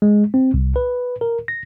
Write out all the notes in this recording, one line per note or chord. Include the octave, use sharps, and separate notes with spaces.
G#3
C4
C2
B4
A#4
A#6